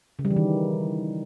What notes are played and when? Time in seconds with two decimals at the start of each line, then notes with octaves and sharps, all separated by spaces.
0.19 C#3
0.25 G3
0.31 E3
0.36 D#3